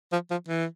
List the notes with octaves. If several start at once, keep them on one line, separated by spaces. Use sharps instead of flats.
F3
F3
E3